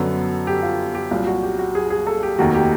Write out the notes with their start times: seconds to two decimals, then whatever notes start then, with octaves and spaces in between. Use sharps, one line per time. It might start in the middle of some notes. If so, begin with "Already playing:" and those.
Already playing: G1 F#2 D3 F#3 B3 A4
0.47 G4
0.63 F4
0.95 G4
1.11 C2 A#2 F#3 F4
1.27 F#4
1.43 G4
1.59 F#4
1.75 G#4
1.90 G#4
2.07 A4
2.23 G4
2.39 F1 D#2 D#3 F#4
2.54 G4